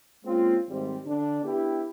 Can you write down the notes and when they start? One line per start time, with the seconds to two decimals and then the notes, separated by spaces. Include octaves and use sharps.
0.24 G#3 A#3 C4 C#4 F4
0.69 G#1 G3 C4
1.06 D3 D4
1.43 B3 D4 E4 G4